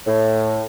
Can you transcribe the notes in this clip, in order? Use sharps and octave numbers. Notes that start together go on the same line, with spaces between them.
A2